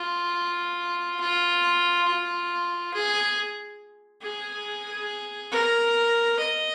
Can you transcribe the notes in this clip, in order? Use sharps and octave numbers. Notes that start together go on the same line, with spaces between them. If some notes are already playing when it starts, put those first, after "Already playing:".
Already playing: F4
F4
F4
G#4
G#4
A#4
D#5